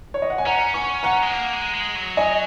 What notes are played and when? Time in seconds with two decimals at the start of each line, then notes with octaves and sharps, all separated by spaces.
0.14 C#5
0.22 D#5
0.30 F#5
0.38 G#5
0.46 C#4 F#5 A#5
0.74 G#5 C#6
1.03 F#5 A#5
1.22 G#3
1.32 A#3
1.53 G#3
1.74 G#3
1.95 F#3
2.17 D#5 G#5